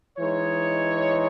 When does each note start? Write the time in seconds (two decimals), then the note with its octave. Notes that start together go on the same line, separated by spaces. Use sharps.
0.18 E3 G#3 D#4 C#5